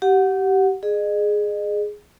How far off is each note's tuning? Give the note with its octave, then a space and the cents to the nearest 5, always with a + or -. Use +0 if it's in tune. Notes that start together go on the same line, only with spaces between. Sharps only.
G4 -25 F#5 -10
G#4 +5 D#5 -40